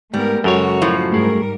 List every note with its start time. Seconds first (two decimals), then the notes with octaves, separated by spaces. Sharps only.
0.14 G#2 G3 A3 B3 A#4
0.44 F#2 C#3 G#3 F#4 A4 A#4 C#5
0.82 A2 F3
1.12 G#2 G3 A3 G#4 A#4